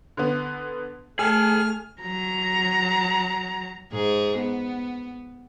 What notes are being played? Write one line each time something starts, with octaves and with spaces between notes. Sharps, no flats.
D3 B3
A3 G#4 G#5 A5 F6
F#3 A#5
G#2 G#4
B3